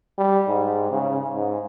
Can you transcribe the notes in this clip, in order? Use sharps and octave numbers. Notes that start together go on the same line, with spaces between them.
G3
G#2
C#3
G#2